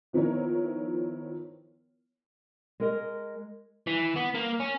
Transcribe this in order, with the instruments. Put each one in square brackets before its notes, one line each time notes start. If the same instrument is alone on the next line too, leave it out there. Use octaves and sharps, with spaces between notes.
[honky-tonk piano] D#3 F3 B3 E4 A#4 C#5
[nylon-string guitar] G#3 A#4 D#5
[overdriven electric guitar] E3
B3
A#3
C#4